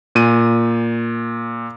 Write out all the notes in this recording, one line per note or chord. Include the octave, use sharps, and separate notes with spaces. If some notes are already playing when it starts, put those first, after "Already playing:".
A#2 D#7